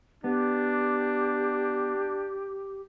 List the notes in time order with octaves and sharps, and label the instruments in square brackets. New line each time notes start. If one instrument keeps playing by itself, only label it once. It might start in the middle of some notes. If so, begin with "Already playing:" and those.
[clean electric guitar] B3 [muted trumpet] D4 [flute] G4